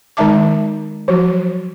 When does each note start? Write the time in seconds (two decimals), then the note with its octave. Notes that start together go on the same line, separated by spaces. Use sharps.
0.17 D#3 G#3 D#4 E5 A5 D6
1.08 F3 F#3 F#4